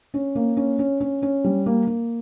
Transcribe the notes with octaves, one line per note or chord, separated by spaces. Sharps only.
C#4
A#3
C#4
C#4
C#4
C#4
G3
A#3
A#3